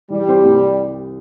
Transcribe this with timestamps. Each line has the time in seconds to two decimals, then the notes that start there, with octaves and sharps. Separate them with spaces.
0.10 E3 G3
0.28 C4 G4 C5
0.44 C2